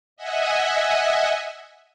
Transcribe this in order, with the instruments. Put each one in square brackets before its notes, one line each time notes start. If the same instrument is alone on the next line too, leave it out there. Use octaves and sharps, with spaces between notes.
[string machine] D#5 E5 F#5 G#5